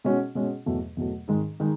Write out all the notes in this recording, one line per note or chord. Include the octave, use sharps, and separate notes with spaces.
B2 G#3 C#4 F#4
B2 G#3 C#4 F#4
E2 B2 F#3 A3
E2 B2 F#3 A3
G#2 D#3 G#3 D#4
D#3 G#3 D#4